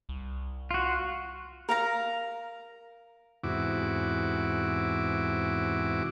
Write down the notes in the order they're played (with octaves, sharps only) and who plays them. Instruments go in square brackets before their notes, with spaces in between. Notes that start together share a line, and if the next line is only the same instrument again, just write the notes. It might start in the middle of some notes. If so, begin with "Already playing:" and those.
[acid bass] C2
[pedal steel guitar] F4 F#4
[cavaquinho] A#4 F5 A#5
[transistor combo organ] E2 G#2 C3 E4 F#4 D6